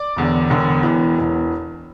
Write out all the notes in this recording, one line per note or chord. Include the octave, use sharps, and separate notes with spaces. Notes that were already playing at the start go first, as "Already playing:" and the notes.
Already playing: D5 D6
E1 E2 D3
E1 E2 D3
E1 E2 E3
E1 E2 E3